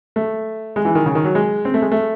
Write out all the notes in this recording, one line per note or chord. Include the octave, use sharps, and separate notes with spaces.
A3
G#3
E3
D#3
C#3
D#3
F#3
G#3
C4
A3
G#3
A3